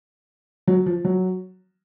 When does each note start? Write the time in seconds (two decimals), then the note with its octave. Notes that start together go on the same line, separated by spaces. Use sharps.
0.67 F#3
0.86 F3
1.05 F#3